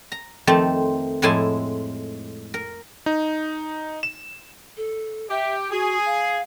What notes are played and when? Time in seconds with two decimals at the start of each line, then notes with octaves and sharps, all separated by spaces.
0.12 A#5
0.47 F2 D#3 A3 C4 A5
1.22 F2 A2 G#3 E4 G#5 A5
2.54 A#4
3.06 D#4
4.03 E7
4.77 A4
5.30 G4 E5
5.71 F#4 G#4
6.06 F5